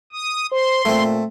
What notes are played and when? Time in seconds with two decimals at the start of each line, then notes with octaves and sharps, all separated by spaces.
0.12 D#6
0.52 C5 C6
0.85 A#2 A3 C4